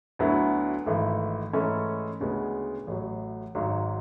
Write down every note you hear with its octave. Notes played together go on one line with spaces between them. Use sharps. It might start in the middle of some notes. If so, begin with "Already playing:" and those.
D2 D3 F#3 B3 E4
G#1 G#2 E3 A3
G#2 E3 A3 C#4
D2 C#3 G#3 B3
A1 A2 F#3
G#1 G#2 F#3